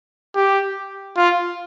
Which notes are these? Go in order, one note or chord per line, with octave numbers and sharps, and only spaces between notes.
G4
F4